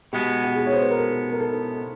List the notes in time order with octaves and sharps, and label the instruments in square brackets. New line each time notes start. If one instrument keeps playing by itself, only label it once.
[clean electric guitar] B2 G#3 B3 [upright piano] G4
[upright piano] G4
G#4
C#5
C5
B4
A#4
A4
A#4
A4